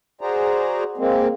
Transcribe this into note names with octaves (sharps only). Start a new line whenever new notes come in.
F#4 G#4 C5 D5 A#5
G#3 A#3 C4